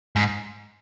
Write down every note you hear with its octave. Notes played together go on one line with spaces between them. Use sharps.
G#2